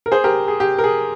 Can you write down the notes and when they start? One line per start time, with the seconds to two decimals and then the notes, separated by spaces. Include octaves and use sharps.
0.06 A#4
0.12 G#4 C5
0.24 G4 A#4
0.48 G#4
0.60 G4
0.79 A#4
0.84 G#4